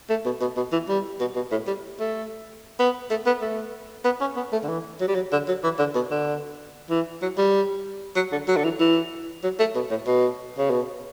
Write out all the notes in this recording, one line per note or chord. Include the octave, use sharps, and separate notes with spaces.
A3
B2
B2
B2
E3
G3
B2
B2
A2
G3
A3
B3
A3
B3
A3
B3
C#4
B3
A3
D3
E3
F#3
G3
F#3
D3
F#3
E3
D3
B2
D3
E3
F#3
G3
F#3
D3
F#3
D3
E3
E3
F#3
A3
B2
A2
B2
C#3
B2